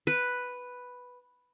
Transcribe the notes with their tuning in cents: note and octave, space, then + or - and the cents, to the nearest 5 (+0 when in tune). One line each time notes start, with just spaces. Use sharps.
B4 +0